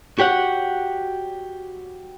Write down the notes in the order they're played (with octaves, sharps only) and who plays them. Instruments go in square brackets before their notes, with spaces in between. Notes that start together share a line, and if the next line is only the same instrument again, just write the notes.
[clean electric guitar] F#4 G4 C#5 F#5